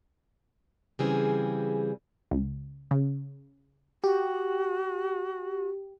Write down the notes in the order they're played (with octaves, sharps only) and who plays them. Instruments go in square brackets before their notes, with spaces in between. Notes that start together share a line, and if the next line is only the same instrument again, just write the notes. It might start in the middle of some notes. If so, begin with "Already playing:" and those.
[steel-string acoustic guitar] C#3 E3 G3 C4 G#4
[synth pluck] C#2
C#3
[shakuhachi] F#4 [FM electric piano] G4